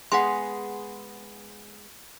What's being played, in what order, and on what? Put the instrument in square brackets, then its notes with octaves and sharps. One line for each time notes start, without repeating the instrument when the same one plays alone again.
[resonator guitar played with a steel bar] G#3 B3 G#4 [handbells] F#5 C6